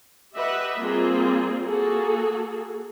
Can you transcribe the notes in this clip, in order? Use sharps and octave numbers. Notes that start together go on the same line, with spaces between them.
G4 B4 D#5 E5 F#5
G3 A#3 C4 F4 G#4
A#3 F#4 G#4 A4